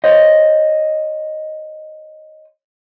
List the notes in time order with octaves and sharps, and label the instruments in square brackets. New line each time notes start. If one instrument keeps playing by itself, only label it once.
[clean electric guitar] C5 C#5 D#5